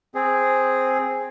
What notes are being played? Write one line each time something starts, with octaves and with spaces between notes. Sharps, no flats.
C4 G#4